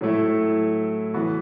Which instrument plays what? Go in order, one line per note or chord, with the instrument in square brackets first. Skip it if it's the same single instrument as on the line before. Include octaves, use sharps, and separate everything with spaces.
[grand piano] A2 F#3 A3 E4
E3 B3 F#4